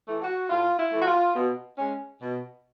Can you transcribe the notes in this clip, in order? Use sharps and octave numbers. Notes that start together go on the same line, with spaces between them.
E3 A3
F#4
A2 F4
E4
E3 A3
F#4
F4
B2
G#3 C#4
B2